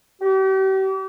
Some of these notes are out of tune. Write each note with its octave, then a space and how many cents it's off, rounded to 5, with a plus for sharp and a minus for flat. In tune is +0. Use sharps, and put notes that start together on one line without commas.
G4 -40